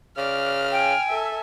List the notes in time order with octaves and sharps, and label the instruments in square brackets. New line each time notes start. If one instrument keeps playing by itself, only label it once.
[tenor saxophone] C#3 [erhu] D5 [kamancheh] F6
[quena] G5 [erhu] G#5
[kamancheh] A4 E5